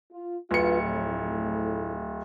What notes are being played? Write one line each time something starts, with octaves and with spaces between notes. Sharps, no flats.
F4
D1 F4 F#4 B4 C#7
F2 A2